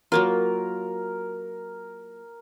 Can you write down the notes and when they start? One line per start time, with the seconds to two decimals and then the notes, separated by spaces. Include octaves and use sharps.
0.12 F#3 A#3 F4 A#4